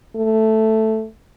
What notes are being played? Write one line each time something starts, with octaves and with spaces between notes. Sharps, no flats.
A3